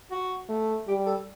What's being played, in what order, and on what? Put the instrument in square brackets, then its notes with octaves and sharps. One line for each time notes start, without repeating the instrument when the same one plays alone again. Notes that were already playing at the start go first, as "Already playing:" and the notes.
[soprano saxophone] F#4
[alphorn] A3
[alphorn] G3 [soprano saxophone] G4
[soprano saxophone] A4